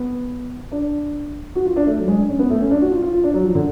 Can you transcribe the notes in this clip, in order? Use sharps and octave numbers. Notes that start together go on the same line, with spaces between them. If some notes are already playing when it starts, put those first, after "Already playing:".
Already playing: B3
D4
F#4
F4
D4
A3
F#3
G#3
D4
C#4
B3
A3
C#4
D4
F#4
F4
F4
F4
D4
F#3
F3
D3